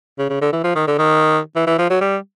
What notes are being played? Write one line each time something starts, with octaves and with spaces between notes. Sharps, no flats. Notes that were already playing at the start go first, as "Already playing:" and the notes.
C#3
C#3
D3
E3
F3
D#3
D3
D#3
E3
E3
F3
F#3
G3